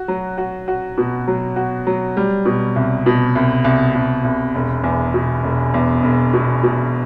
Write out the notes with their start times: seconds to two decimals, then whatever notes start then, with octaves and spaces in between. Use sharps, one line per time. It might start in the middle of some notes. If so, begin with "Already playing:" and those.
Already playing: F#4
0.08 F#3
0.38 F#4
0.68 F#4
0.98 B2
1.28 F#3
1.56 F#4
1.87 F#3
2.17 G3
2.45 B2
2.76 C2
3.06 B2
3.36 C2
3.64 C2
3.95 C2
4.24 C2
4.55 E1
4.83 E2
5.14 B2
5.44 E1
5.74 E2
6.03 E1
6.33 B2
6.63 B2